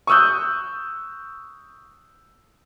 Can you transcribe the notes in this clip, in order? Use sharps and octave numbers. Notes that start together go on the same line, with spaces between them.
C#6 D#6 E6 F#6 G6